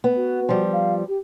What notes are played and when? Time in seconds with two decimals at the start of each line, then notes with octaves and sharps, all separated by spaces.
0.04 B3
0.16 F#4
0.49 F3 G3
0.73 F5
1.08 G4